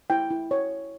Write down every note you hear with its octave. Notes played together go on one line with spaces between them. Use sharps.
E4 G5
E4
C#5